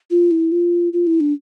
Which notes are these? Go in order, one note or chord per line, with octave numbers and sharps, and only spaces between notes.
F4
E4
F4
F4
E4
D4